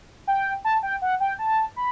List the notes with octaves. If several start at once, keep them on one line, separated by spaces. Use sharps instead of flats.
G5
A5
G5
F#5
G5
A5
B5